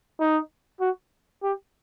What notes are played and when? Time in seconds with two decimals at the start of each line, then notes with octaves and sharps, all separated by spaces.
0.20 D#4
0.81 F#4
1.43 G4